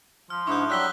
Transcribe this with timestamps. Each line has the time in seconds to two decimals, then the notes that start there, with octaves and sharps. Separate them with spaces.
0.30 F3 F6
0.47 G#2 D4 E4 C#6 D#6 F#6 G6
0.70 F#3 G3 E6 F#6 B6 G7